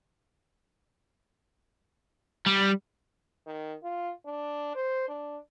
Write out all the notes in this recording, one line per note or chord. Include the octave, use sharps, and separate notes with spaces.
G3
D#3
F4
D4
C5
D4